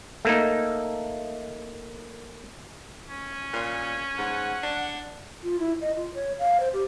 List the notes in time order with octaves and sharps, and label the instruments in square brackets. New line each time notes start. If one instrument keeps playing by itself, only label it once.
[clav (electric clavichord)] A3 A#3 D#4
[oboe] C#4
[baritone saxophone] A#2
[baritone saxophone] G#2 [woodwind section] F#5
[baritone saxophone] D4
[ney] F4
E4
D#5
F4
C#5
F5
C5
G4